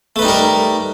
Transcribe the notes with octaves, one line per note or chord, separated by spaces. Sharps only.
G3 A3 D#4 A#4 B4